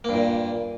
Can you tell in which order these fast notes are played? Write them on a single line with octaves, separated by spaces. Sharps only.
A#3 G2 A#2